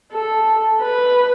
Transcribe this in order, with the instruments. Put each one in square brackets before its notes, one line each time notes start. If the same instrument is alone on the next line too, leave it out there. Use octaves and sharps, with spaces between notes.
[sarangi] A4
B4